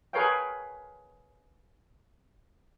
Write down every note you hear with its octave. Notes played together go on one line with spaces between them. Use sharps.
G#4 A#4 B4 C#5 F5 G5